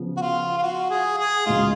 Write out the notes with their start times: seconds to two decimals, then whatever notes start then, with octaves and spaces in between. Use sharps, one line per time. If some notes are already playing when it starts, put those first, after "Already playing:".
Already playing: C#3 F3 B3
0.17 F#4
0.21 F4
0.58 F4
0.63 F#4
0.90 G#4
1.18 G#4
1.46 C#2 C#3 G#3 D#4 F4